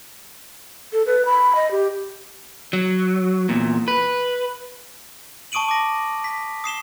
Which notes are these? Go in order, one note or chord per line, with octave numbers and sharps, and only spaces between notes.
A4
B4
B5
D#5
G4
F#3
E2 A#2
B4
A5 C#6 D#6 D7 D#7 F#7
D6 A#6
B6
D#6 C7 E7 G7